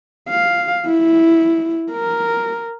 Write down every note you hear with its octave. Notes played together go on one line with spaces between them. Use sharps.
F5
E4
A#4